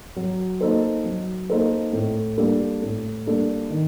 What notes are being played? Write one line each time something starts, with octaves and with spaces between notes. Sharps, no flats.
F#3
A#3 D#4 A4 C5
F#3
A#3 D#4 A4 C5
A2
G3 A#3 D4 A4
A2
G3 A#3 D4 A4
D#3